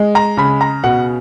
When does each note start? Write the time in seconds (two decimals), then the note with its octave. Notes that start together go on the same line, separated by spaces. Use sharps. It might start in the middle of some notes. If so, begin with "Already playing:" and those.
Already playing: G#3
0.15 A#5
0.37 C#3 B5
0.61 A#5
0.84 B2 F#5